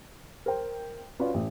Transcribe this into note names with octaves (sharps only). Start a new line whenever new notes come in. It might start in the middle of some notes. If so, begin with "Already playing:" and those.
A#4 C5 G5
C#4 F4 F#4 B4 C#5 D5
A1